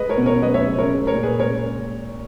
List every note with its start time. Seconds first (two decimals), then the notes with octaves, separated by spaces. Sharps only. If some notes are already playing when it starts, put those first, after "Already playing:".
Already playing: G#3 B4 D#5
0.09 A#4 C#5
0.17 B2
0.26 A#4 C#5
0.42 F#3 B4 D#5
0.54 C#5 E5
0.67 C#3
0.78 A#4 C#5
0.91 G#3
1.07 A#4 C#5
1.15 A#2
1.23 G#4 B4
1.39 G#3 A#4 C#5